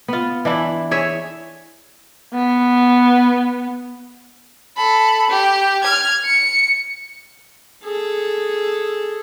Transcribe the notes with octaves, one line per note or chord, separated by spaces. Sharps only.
B3 F4
E3 D4 E4
G#4 C#5 E5
B3
A4 B5
G4
F6 G#6
C#7
G#4 A4